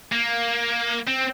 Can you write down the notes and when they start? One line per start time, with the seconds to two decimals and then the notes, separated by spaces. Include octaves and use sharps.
0.12 A#3
1.08 C4